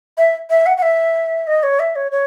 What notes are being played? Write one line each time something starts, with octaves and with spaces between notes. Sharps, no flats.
E5
E5
F#5
F#5
E5
D#5
C#5
E5
C#5
C#5